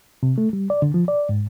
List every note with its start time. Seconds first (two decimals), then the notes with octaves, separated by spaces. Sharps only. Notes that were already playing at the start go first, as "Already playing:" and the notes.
0.23 C3
0.38 A3
0.53 G3
0.70 D5
0.82 D3
0.94 F3
1.08 D5
1.29 G#2